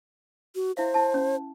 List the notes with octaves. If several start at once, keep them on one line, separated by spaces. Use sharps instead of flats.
F#4
E4 C5 E5 F5
E4 A5
C#4